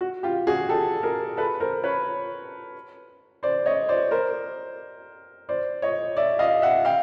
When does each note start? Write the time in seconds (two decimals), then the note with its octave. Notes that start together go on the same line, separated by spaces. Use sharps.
0.01 F#4
0.23 F4 G4
0.47 F#4 G#4
0.69 G4 A4
1.03 G#4 A#4
1.37 A4 B4
1.60 A#4 C5
1.84 B4 C#5
3.43 C5 D5
3.66 C#5 D#5
3.89 C5 D5
4.11 A#4 C5
5.49 C5 D5
5.82 C#5 D#5
6.17 D5 E5
6.39 D#5 F5
6.62 E5 F#5
6.85 F5 G5